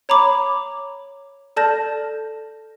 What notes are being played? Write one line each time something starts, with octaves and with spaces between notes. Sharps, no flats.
C#5 A#5 B5 D6
A4 D5 A5 F6 G6 A#6